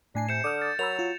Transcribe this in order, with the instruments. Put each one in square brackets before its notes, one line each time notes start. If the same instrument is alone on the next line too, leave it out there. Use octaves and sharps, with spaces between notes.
[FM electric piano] A2 G#5 C7 [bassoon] D4
[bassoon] C3 [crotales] G6 C#7 E7
[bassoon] D3 [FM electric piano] D6 D#6 F6
[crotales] A6
[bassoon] F#3 [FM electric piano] A#4 B5 E6 [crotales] F7
[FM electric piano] F4